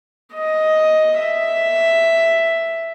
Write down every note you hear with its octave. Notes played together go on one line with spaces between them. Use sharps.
D#5
E5